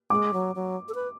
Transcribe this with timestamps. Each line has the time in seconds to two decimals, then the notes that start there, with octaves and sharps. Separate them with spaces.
0.10 G#3 D6
0.33 F#3
0.55 F#3
0.89 A4
0.95 B4